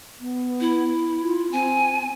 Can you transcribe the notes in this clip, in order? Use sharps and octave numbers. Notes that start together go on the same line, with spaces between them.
B3
E4
F4
C4 G#5